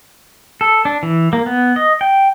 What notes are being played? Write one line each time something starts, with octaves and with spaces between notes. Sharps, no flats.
A4
D4
E3
A#3
B3
D#5
G5